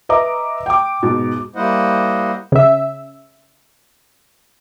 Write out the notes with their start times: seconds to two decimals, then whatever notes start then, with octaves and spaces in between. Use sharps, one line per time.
0.09 B4 D#5 E5 A#5 D6
0.66 G5 D6
1.03 G#2 B2
1.56 G3 A#3 E4 C5 D#5 F#5
2.52 C#3 E5